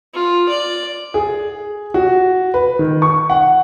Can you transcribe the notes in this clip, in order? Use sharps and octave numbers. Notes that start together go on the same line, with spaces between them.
F4
D5
G#4
F#4
B4
D#3
C#6
F#5